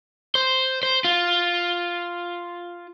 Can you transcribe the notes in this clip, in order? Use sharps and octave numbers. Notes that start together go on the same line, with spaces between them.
C5
C5
F4